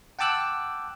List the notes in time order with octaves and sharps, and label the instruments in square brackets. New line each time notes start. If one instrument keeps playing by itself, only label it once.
[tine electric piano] F#5 G5 A5 D6 E6 F#6